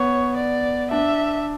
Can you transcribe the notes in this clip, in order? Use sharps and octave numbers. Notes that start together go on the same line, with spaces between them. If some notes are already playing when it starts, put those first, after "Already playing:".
Already playing: B3 C#5
D5
D4 E5